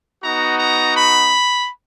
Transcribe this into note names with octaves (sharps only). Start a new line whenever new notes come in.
B3 D#4 F#4 A#5
A#5
B5